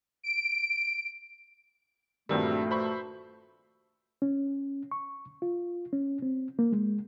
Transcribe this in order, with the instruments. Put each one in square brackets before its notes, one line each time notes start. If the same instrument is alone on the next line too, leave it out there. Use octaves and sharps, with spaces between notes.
[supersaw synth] D7
[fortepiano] A#1 G2 D#3 [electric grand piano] G3 C4 [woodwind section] A3 [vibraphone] F#4 E6
[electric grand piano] C5 B5 C#6
[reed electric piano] C#4
C#6
F4
C#4
C4
A#3
G#3